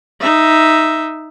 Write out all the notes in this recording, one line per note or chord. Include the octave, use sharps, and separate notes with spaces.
D#4 E5